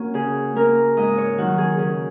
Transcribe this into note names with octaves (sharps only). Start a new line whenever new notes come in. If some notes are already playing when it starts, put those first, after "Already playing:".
Already playing: A#3 C#4 F#4
C#3 G#4
A#3 C#4 A#4
G#2 D#5
C#5
D#3 F#3 F#4
G#4
C#3 G#4